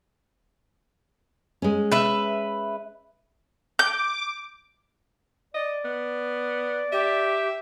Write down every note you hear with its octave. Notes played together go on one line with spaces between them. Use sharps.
G#3 C#4
B4 E5
D6 G6
D5 D#5
B3
G4 E5